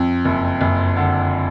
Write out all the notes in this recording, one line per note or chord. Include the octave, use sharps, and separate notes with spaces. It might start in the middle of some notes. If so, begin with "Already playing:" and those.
Already playing: F2
F#1
F#1
D3